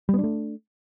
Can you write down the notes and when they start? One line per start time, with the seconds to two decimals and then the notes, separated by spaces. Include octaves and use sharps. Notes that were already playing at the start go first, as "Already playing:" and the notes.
0.09 G3
0.14 B3
0.19 D4
0.24 A3